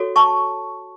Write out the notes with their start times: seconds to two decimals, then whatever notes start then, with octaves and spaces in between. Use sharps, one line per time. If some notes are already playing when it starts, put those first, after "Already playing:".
Already playing: F#4 A4 C#5
0.16 A5 C#6